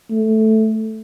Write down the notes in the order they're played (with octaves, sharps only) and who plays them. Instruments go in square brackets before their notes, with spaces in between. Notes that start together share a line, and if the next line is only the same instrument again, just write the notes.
[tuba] A3